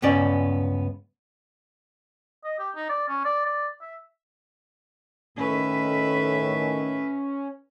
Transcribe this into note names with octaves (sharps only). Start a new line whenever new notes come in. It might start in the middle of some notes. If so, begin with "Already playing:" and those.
C#2 G2 B3 C#4 D5
D#5
G4
D#4
D5
C#4
D5
D5
E5
A2 D#3 C#4 B4 E5